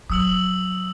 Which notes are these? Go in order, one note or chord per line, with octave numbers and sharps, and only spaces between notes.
F#3 D#6 E6 F#7